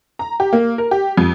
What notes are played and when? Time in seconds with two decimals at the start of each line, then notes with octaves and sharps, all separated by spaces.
0.19 A#5
0.40 G4
0.53 A#3
0.78 A#4
0.91 G4
1.18 F2